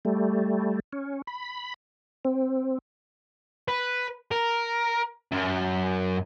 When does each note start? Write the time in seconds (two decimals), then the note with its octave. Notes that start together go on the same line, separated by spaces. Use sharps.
0.05 G3 A3
0.93 C#4
1.27 B5
2.25 C4
3.68 B4
4.31 A#4
5.32 F#2